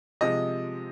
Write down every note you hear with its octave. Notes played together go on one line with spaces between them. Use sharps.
C3 F3 G#3 D#5